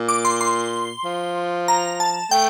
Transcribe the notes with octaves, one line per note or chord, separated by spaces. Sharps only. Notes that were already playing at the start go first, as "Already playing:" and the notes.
Already playing: A#2
D6
C6
C6
F3
A#5
A5
A3 G5